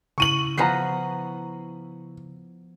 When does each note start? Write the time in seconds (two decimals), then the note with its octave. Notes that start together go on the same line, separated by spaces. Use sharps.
0.18 C#3 E4 C#6 D#7 F#7
0.57 F3 B3 B4 A#5 C7